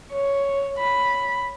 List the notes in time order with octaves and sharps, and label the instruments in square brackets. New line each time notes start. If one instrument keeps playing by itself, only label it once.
[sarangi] C#5
B5